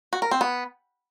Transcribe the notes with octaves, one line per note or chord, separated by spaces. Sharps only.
F#4
A#4
C4
B3